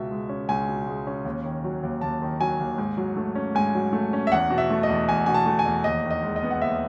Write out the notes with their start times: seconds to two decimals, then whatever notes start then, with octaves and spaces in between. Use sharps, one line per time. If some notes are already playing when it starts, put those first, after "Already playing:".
Already playing: C#2 B2 E5
0.11 G#3
0.29 C#4
0.48 C#2 G#5
0.68 B2
0.87 G#3
1.07 C#4
1.25 D#2
1.44 D#3
1.64 F#3
1.83 D#2
2.01 D#2 A5
2.22 D#3
2.40 F#3 G#5
2.60 D#2
2.78 G#2
2.97 F#3
3.16 A3
3.35 C#4
3.55 G#2 G#5
3.75 F#3
3.93 A3
4.13 C#4
4.27 E5
4.32 E2 F#5
4.50 B2
4.58 E5
4.70 A3
4.83 D#5
4.89 E2
5.08 E2 G#5
5.26 B2 G#5
5.34 A5
5.46 A3
5.59 G#5
5.66 E2
5.84 D#2 D#5
6.04 D#3
6.11 D#5
6.23 G#3
6.36 D#5
6.43 B3
6.51 F#5
6.62 D#2 E5